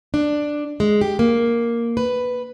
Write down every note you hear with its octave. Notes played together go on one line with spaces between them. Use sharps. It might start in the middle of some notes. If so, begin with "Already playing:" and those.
D4
G#3
G4
A#3
B4